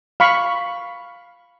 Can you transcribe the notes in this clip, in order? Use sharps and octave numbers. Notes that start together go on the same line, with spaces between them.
F5 B5 C#6